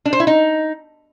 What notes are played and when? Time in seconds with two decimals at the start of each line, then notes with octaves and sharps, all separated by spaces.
0.05 D4
0.13 C5
0.20 E4
0.27 D#4